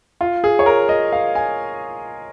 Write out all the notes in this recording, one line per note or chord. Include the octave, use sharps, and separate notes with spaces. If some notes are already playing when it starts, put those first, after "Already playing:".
F4
G#4
C#5
A#4
D#5
F5
G#5